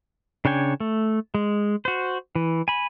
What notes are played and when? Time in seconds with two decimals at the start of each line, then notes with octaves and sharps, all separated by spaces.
0.45 C#3 D4 C#5 G5 G#5
0.80 A3
1.34 G#3
1.85 F#4 C5
2.35 E3
2.68 G#5 B5